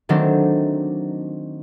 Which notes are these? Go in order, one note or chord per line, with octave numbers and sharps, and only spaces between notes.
D#3 F#3 A3 C4 D4